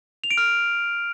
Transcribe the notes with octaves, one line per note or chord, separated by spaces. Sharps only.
F7
D7
F6